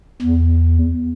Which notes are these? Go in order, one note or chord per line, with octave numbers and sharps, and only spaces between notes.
E2